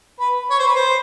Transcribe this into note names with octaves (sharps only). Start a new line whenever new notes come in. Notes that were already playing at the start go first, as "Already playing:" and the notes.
B4
C#5
C5
B4
C5